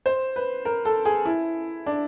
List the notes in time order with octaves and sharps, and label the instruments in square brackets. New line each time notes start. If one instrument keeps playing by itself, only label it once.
[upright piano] C5
B4
A#4
A4
G#4
E4
D4